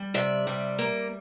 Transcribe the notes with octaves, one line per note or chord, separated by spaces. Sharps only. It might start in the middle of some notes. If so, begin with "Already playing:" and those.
Already playing: G3
C3 D5 E5
G3
A#3